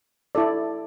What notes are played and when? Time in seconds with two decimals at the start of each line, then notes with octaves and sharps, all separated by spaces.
0.35 E4 A4 D5